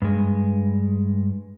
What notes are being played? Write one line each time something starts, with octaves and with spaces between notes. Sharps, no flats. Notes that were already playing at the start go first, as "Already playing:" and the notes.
G2 G#3